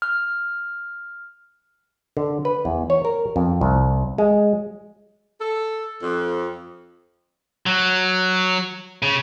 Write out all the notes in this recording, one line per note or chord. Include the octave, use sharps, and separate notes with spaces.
F6
D3
B4
E2
C#5
A#4
F2
C2
G#3
A4
F2
F#3
C#3